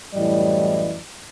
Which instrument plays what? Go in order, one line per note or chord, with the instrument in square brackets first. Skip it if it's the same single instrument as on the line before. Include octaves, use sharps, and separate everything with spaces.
[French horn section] F#2 A2 E3 G3 D5 D#5